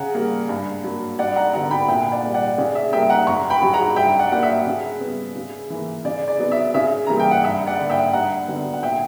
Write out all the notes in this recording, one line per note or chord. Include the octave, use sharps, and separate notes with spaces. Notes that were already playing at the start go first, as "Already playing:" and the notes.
Already playing: C#3 F#5 A#5
G3 A#3
G2
F#3 A#3
G2 D5 F#5
F#5 A#5
D3 F#3 B3 F#5 A#5
G5 B5
A#2 E5 G5
D5 F#5
G3 A#3
D5 F#5
C#3 D5
E5
G3 A#3 E5 G5
F#5 A#5
F#2 A#5 C#6
G5 B5
C#3 F#3
F#5 A#5
G2 E5 G5
D5 F#5
F#3 A#3 F#5
E5
C#3
G3 B3
C#3
E3 A#3
C#3 D5
D5
F#3 B3
E5
C#3 E5
E3 G3 A#3 A#5
G5
F#5
G2 E5
D5 F#5
D3 A#3
E5 G5
G2 F#5 A#5
D3 F#3 B3
F#5
A#2 E5 G5